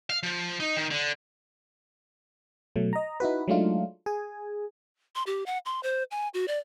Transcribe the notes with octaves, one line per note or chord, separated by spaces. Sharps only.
F5
F3
D#4
D#3
D3
B2 F#3 A3
D#5 A#5
D#4 E4 F#4 B4
F#3 G#3 A3 D4 D#4 F4
G#4 G#5
C6
G4
F#5
C6
C5
G#5
F#4
D5